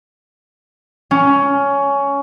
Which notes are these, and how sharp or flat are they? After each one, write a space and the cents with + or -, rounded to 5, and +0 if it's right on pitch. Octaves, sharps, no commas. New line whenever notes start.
C#4 +15